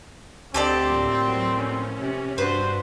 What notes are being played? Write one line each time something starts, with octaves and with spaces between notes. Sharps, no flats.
D2 D3 C4 G4 A4 D5 D#5
A2 F3 A#3
F#3
C#4
C3
G2 D4 F#4 B4 C5